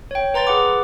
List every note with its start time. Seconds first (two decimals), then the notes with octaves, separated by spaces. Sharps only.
0.11 C#5 G5
0.34 B4 A#5 C6 A6
0.47 G#4 B4 F#5 D6